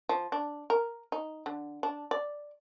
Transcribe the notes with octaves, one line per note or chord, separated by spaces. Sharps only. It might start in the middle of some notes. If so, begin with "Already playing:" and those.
F3
D4
A#4
D#4
D3
D4
D5